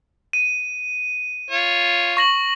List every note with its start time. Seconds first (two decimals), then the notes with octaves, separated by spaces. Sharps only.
0.33 D#7
1.51 F4 C#5
2.17 C#6 A#6 F#7